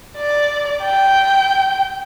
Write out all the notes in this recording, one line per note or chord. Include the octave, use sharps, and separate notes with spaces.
D5
G5